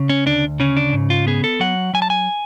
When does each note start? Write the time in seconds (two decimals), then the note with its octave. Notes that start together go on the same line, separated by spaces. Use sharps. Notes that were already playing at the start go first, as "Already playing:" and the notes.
Already playing: C#3
0.10 C#4
0.26 D2 D4
0.60 C#3 C#4
0.77 D4
0.93 G#2
1.10 F4
1.27 B3 G#4
1.44 A4
1.60 F#3 F#5
1.94 F#3 G#5
2.02 A5
2.10 G#5